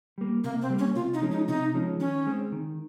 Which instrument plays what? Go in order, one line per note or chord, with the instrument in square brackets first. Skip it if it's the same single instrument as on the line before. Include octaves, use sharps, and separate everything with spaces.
[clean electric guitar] G3 A#3
[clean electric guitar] C3 [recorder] A#3
[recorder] C4
[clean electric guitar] G3 A#3
[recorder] C#4
[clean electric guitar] C3 [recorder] F4
[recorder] D#4
[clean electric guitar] F3 G#3 C#4
[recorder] D#4
[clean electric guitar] C3 [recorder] D#4
[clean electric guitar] F3 G#3 C#4
[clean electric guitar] D#3 [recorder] C#4
[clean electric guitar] G#3 C4
D#3